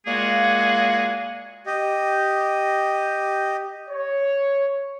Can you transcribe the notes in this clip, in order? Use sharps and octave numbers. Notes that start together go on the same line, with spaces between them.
A#2 G#3 A#3 F#4 G#4
G4 D#5
C#5